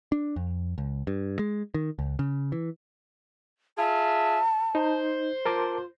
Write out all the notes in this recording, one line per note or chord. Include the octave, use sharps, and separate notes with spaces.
D4
F2
C#2
G2
G#3
D#3
C#2
C#3
E3
F4 G#4 E5 A5
D#4 C5
F4 A#4 A5 D6